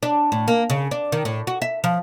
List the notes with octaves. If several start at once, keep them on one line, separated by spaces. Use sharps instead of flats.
D4
A2
A#3
C#3
D4
D#3
A2
F#4
E5
F3